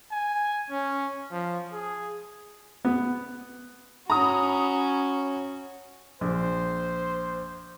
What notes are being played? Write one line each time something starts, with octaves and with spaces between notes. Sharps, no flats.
G#5
C#4
F3
G#4
B3
C#4 F#4 A#5 B5 D#6
A#1 C5